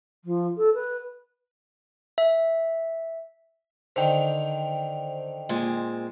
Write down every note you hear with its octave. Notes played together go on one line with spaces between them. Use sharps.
F3
A4
B4
E5
D3 D#3 C5 G5
A#2 G#3 C4